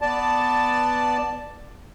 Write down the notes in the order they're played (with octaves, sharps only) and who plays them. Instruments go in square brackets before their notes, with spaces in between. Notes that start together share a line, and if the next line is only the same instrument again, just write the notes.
[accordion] B3 D5 A5